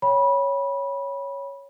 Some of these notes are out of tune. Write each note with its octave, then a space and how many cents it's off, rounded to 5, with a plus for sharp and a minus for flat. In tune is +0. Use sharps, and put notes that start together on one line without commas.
C#5 +0 G5 +10 B5 -20